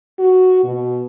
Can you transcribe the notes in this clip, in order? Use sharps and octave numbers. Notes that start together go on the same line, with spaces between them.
F#4
B2